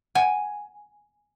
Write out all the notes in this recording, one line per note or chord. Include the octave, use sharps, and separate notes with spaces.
F#5 G#5